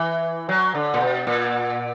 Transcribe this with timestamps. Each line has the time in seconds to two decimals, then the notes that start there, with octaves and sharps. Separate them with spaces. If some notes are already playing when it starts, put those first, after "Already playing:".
Already playing: E3
0.49 F#3
0.75 D3
0.94 A#2
1.00 B2
1.27 A#2